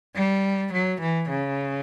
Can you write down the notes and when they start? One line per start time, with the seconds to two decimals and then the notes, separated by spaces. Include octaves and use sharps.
0.15 G3
0.73 F#3
1.00 E3
1.29 C#3